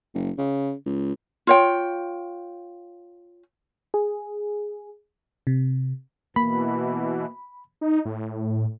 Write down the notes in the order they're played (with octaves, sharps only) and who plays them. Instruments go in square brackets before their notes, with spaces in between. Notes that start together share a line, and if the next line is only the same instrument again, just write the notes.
[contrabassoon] F#1
C#3
C#2
[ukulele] F4 C#5 G5
[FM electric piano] G#4
C3
[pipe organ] B2 E3 [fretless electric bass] A#3 [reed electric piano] B5
[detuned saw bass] D#4
A2